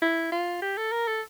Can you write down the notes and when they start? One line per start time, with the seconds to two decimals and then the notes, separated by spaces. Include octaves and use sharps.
0.02 E4
0.32 F4
0.62 G4
0.77 A4
0.92 A#4
1.08 A4